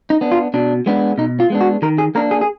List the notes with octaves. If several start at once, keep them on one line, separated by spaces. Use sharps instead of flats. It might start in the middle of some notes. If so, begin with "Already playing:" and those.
D#4
B3 D4
F4
B2 D4
G#3 B3 D4
B2 D#4
F4
G#3 B3 D4
F#4
D#3 A#4
G#4
A#3 D4 A#4
G#4
G#4